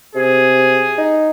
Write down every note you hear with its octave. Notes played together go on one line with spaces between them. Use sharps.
C3 G#4
D#4